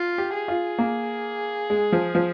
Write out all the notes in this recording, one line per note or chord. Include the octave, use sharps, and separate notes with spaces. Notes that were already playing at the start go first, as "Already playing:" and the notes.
Already playing: F4
G4
G#4
F4
A#3
G#3
F3
F3